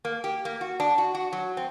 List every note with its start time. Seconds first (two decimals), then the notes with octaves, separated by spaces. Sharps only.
0.05 A#3
0.24 G4
0.45 A#3
0.61 F#4
0.80 D4
0.98 F#4
1.15 F#4
1.33 F#3
1.57 C4